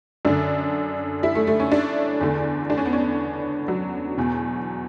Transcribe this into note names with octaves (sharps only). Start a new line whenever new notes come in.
F#2 D3 D4
E4
A3
A3
C#4
D4
E2 D3
D4
C#4
B3
C#4
F#3
E2 B2